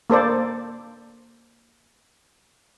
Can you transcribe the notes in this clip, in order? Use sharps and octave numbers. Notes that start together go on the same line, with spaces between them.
A#3 A4 C5 D5